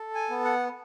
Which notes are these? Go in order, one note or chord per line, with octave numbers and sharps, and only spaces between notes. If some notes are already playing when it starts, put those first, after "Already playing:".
Already playing: A4
G#5
B3
F#5